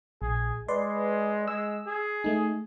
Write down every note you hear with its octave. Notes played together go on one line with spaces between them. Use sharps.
A#1 G#4
G#3 B4 D5 C6
G#3 E6
G#4
A3 D#4